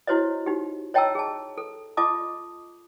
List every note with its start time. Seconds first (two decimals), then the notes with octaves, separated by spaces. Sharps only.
0.07 E4 F#4 C5 C#5 D#5
0.46 D#4 F#4 G4
0.94 C#5 D#5 G5 A5 A#5 E6
1.15 G#4 A5
1.58 A4
1.97 F4 D#5 A5 D6 D#6